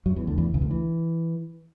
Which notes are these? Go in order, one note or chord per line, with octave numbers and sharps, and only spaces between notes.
F#2 F#3
E2 E3
D2 D3
E2 E3
C#2 C#3
D2 D3
E3